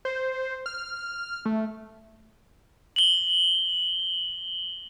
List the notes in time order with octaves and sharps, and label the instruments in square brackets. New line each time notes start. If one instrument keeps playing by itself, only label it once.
[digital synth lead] C5
F6
A3
[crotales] F#7 G7